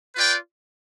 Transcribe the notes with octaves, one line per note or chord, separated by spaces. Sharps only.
F4 B4 D5 G5